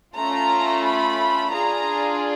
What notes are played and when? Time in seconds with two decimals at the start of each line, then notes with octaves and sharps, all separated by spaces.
0.15 A3 C#4 F4 A#5
0.84 B5
1.52 D4 F4 G#4 A#5